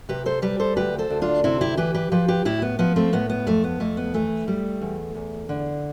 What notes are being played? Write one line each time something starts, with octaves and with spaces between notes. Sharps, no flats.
C3 G4 B4
A4 C5
G3 G4 B4
A4 C5
D2 G4 B4
A4 C5
D2
D4 F4
C3 C4 E4
E4 G4
E3 G4 B4
G4 B4
F3 G4 B4
G4 B4
A2 E4 G4
B3
F3 B3
A3 C4
A2 B3
B3
F2 A3
B3
F2 A3
B3
E3 A3
G3
E2
E2
D3